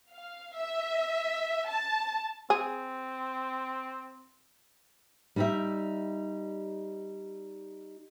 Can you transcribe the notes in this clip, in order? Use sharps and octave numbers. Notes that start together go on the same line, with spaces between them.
F5
E5
A5
C4 G#4
G3 D#4 G4 D5 E5